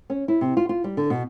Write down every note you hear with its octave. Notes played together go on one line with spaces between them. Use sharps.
C#4
E4
C3
F4
F4
G3
D3
B2